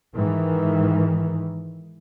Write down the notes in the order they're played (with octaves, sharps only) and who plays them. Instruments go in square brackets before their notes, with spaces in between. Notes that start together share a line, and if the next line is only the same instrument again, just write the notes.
[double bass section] G#2 D#3 E3